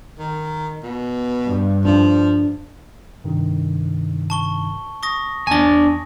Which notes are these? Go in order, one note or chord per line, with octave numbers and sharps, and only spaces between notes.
D#3
B2
G2
F3 D4
G2 C3 D#3
A5 C#6 G7
C#6 D#6 A#6
E2 D4 G#5 A5 A#6